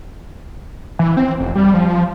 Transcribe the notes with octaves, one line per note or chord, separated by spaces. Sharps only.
E3
C4
F1
G3
F3